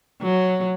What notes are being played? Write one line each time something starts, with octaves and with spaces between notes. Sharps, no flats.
F#3